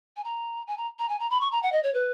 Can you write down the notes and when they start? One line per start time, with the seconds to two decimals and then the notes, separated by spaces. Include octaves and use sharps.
0.17 G#5
0.24 A#5
0.67 G#5
0.78 A#5
0.99 A#5
1.09 G#5
1.20 A#5
1.30 B5
1.41 C#6
1.52 A#5
1.63 F#5
1.72 D#5
1.83 C#5
1.94 B4